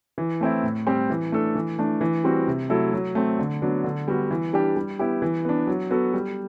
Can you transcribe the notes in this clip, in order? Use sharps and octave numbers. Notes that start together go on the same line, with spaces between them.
E3
A3 C4 E4
A2
G3 C4 G4
E3
A3 D4 A4
E3
A3 D4
E3
G3 C4 F#4
C3
F#3 A3 E4 A4
F#3
A3 C4
D3
F#3 B3 D4
D3
G3 B3 F#4
E3
G3 D4 G4
G3
B3 E4 G4
E3
B3 D4
F#3
B3 F#4 A4
G3